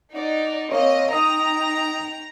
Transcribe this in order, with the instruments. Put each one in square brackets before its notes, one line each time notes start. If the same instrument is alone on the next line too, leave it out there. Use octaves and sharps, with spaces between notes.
[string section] D#4 [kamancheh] D5 F#5
[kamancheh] A#3 C4 [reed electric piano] C#5 [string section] D#5
[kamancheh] D#4 G5 [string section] A#5 [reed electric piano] D#6